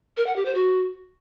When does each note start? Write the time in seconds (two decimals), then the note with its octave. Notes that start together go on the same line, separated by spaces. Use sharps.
0.17 A#4
0.26 F#5
0.36 G4
0.45 C5
0.55 F#4